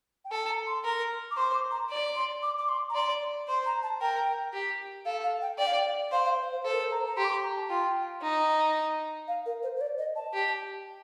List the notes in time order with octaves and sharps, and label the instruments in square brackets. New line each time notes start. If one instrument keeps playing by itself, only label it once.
[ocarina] G5
[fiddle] A4 [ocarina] A5
[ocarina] A5
A#5
C6
[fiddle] A#4
[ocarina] D6
[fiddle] C5 [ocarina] C6
[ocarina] D6
A#5
[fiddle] D5
[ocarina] C6
D6
D6
C6
A#5
[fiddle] D5 [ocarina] C6
[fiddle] C5 [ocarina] C6
[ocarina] A#5
A5
[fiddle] A#4 [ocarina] G5
[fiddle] G4
[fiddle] A4 [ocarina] F5
[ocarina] F5
G5
[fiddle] D5 [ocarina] G5
[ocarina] F5
G5
[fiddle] C5 [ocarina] F5
[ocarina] F5
C5
C5
[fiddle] A4 [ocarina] C5
[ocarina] A#4
C5
A#5
A#5
[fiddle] G4 [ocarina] C6
[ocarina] D6
C6
A#5
A5
[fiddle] F4 [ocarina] G5
[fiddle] D#4
[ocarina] F5
A#4
C5
C5
D5
D#5
A5
[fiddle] G4